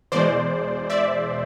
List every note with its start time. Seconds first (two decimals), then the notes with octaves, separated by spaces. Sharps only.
0.12 E2 B2 G#3 C5 D5
0.90 D5 E5